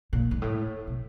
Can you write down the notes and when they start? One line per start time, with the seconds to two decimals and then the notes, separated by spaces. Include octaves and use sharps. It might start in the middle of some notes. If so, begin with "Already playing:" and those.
0.13 A#2
0.31 G#2
0.42 A2
0.87 B2